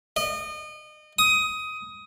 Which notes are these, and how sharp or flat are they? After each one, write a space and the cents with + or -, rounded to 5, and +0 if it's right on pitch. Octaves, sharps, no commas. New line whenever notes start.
D#5 -35
D#6 +15